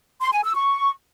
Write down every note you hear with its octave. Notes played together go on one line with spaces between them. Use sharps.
C6
G#5
E6
C#6